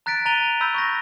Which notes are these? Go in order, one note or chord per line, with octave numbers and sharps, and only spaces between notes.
A#5 F#6 A6 B6 D7
A#5 A6 D#7 F7 G7
B5 E6 G6 B6
C#6 G6 A#6